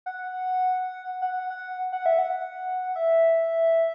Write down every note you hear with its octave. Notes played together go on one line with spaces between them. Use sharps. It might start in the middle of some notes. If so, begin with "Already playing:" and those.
F#5
F#5
F#5
F#5
E5
F#5
E5